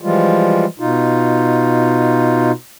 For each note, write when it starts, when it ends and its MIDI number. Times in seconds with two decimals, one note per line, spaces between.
0.01 0.66 52
0.01 0.66 53
0.01 0.66 55
0.01 0.66 56
0.01 0.66 65
0.80 2.52 47
0.80 2.52 63
0.80 2.52 65